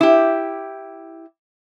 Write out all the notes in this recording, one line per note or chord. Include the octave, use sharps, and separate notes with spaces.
E4 G4